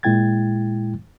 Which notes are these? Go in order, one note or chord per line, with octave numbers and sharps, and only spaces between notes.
A#2 G#3 E4 G5 G#6 A6